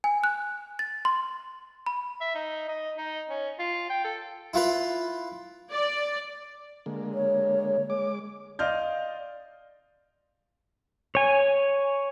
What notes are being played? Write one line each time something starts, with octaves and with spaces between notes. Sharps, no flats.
G#5
F#6
A6
C6
B5
E5
D#4
D#5
D#4
C#4
F4
G5
A4
E4 F4 B4
D5
D3 G#3 A#3
C#5
G#3 D6
D5 D#5 F5 C6 F6 G6
C#5 G#5